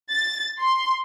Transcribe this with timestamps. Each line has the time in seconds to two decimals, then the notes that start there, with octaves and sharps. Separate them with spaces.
0.11 A6
0.61 C6